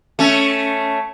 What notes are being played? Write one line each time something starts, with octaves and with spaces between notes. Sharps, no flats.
A3 C#4